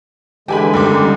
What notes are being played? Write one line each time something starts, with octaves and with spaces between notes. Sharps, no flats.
D3 E3 G#3 G4 G#5 B5
D#2 C#3 G3 D6